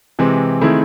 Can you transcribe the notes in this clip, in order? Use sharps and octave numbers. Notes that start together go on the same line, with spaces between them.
C3 E3 G#3 C4
D#3 A3 C4 E4 G#4